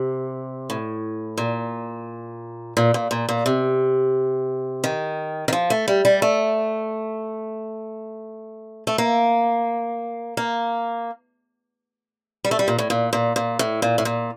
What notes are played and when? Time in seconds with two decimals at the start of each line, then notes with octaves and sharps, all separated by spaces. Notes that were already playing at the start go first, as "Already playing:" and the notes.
Already playing: C3
0.70 A2
1.38 A#2
2.77 A#2
2.94 A#2
3.11 A#2
3.29 A#2
3.46 C3
4.84 D#3
5.48 D#3
5.53 F3
5.70 A3
5.88 G3
6.05 G3
6.22 A3
8.87 A3
8.98 A#3
10.37 A#3
12.44 G3
12.51 A3
12.59 G3
12.68 A#2
12.79 A2
12.90 A#2
13.13 A#2
13.36 A#2
13.59 A2
13.82 A#2
13.98 A2
14.05 A#2